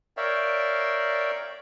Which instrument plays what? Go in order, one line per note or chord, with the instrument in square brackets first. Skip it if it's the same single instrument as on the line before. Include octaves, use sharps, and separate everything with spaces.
[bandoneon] A#4 C#5 D5 E5 F5 G5